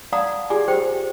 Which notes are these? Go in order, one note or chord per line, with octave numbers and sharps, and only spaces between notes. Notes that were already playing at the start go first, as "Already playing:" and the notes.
D5 F5 F#5 A5 A#5 D#6
F4 G4 G#4 D5 G#5
G4 G#4 C5 G5